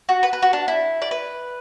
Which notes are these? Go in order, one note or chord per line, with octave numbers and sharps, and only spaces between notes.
F#4
B4
B4
F#4
D4
E4
D5
B4